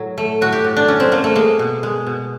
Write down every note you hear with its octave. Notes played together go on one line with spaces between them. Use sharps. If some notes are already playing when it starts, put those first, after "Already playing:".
Already playing: A2 F#3
A3
A2 F#4
G4
A2
D4
F#3 C#4
C4
A3 A#3
A3
G#3 A#3
B2
G#3
B2